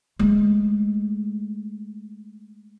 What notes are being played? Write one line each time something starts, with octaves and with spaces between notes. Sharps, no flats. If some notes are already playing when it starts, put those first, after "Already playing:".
G#3 A3